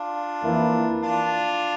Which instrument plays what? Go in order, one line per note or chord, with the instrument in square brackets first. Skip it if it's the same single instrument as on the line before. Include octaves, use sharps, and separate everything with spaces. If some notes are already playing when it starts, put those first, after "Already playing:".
Already playing: [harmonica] D4 F4
[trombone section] F2 E3 A#3 E4
[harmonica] D4 F4